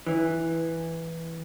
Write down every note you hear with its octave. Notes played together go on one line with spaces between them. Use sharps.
E3